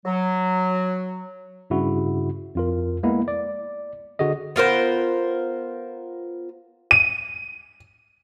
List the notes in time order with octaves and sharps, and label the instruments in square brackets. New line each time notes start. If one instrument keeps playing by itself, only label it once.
[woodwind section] F#3
[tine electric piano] G2 C#3 E4 F#4
F2 F4 A#4
G#3 A#3 B3 E4
D5
D3 F#4 G#4 D#5
[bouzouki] B3 F4 A#4 C5
[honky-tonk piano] D#7